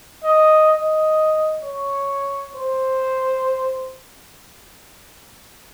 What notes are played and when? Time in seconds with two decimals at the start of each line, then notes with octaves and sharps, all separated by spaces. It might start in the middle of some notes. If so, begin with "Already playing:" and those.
0.24 D#5
0.71 D#5
1.63 C#5
2.55 C5